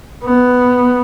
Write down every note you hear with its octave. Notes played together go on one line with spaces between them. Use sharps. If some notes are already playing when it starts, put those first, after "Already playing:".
B3